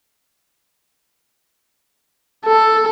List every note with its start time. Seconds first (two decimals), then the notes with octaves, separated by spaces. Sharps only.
2.45 A4